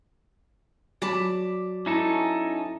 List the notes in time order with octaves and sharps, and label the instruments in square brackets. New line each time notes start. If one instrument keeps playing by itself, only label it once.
[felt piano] F#3 [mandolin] D5 A5 B5
[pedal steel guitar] C#4 D#4 A4 [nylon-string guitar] E4